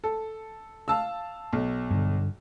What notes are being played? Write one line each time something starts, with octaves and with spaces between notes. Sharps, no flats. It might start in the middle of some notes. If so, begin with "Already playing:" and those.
A4
F5 A5 E6
B1
G2 D3